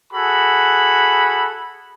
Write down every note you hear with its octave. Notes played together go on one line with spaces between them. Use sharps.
F#4 G#4 A4 B5